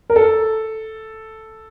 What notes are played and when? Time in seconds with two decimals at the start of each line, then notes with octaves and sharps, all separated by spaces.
0.10 A#4
0.16 A4